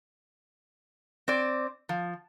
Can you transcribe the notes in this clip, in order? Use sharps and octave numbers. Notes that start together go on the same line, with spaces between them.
C4 D5
F3